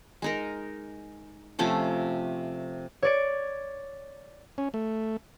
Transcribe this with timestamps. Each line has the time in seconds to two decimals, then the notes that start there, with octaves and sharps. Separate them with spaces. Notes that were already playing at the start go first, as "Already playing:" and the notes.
0.22 G#3 D#4 A#4
1.59 C3 F3 A3 C#4
3.02 C#5 D5 D7
4.58 C#4
4.74 A3